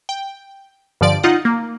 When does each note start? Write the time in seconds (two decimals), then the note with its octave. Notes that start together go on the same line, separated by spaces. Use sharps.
0.09 G5
1.01 G2 D3 F3 D5 D7
1.23 D#4 F4 F#5
1.45 A#3